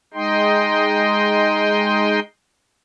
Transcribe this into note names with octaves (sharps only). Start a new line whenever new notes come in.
G#3 D#4 D#5 G5 C6